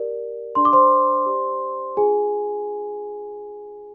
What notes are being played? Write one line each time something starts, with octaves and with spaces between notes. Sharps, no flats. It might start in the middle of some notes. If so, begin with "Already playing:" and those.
Already playing: G4 A#4 D5
D4 G#4 D5 C6
D6
C5 C6
G4 D5
D4 F4 G#4 G#5